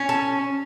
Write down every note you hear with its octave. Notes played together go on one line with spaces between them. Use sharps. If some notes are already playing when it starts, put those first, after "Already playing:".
Already playing: C#4
A4